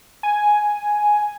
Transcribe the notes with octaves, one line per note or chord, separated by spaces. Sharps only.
G#5